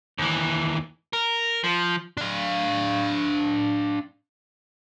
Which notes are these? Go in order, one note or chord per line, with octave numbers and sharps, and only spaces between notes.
D#2 E3
A#4
F3
D4 F5